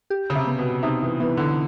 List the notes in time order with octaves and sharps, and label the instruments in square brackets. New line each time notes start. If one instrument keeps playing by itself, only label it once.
[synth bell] G4
[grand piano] C#3
C3
[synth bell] B3
[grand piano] B2
[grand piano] C3 [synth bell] D#4
[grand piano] E3
[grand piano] E3 [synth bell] B3
[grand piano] D3